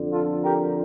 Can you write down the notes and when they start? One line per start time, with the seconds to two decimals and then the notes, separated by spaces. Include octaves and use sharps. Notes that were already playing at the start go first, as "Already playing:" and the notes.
Already playing: F2 D3
0.12 F4 A4
0.43 G4 A#4